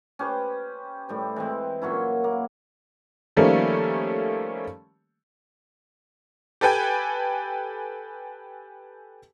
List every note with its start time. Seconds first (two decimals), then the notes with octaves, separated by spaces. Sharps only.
0.19 C#4 G4 B4 C5
1.09 A2 G3 C5
1.36 E3 G#3 C4
1.82 A#2 F#3 C#4 E4
2.24 A#3
3.36 D#3 F3 G3 A3 A#3 C#4
6.61 G4 A4 B4 G5 G#5